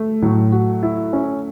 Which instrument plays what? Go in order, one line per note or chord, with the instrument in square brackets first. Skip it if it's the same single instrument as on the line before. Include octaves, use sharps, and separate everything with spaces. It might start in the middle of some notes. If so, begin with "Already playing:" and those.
Already playing: [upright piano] A3
[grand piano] A2 [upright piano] F#3
[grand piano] F#4
E4
C#4